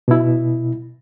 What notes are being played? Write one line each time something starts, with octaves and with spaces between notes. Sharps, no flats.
B2 E4